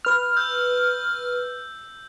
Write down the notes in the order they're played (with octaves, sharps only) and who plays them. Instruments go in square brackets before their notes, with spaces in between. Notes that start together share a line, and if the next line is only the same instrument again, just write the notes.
[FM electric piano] B4 F6
[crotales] E6 G6